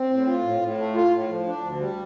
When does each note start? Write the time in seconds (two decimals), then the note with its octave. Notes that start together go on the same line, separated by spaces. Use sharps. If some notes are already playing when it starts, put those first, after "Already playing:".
Already playing: C4
0.09 A2
0.26 F4
0.43 A2
0.61 A2
0.78 A3
0.95 F4
1.12 A2
1.29 F3
1.46 D4
1.62 D2
1.80 G3